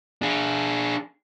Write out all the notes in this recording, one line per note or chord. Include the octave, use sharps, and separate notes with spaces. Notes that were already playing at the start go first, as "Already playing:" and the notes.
D4 G#4